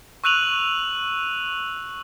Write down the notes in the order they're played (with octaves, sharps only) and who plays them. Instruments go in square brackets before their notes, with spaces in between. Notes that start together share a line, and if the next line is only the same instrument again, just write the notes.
[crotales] C#6 E6 F#6 D#7 F7 F#7